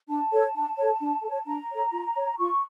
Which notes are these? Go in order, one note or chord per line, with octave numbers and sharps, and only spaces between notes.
D4 A5
A4 C#5
D4
A4 C#5
D4
A4
C#5
D4 A#5
A4 C#5
F4
C#5
F4 C#6